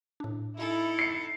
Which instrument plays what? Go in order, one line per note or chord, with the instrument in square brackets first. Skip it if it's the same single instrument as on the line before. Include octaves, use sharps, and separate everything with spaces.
[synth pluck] A2 D4
[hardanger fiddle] D#4 A4 [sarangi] E4
[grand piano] C7 C#7